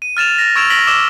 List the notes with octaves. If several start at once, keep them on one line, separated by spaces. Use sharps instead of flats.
D#7
F6 A6 E7 F7
A6 A#6
C#6 E6 G#6 D7 E7 F7
A#6 B6 D7 F#7 G7
D6 E6 E7 F#7 G7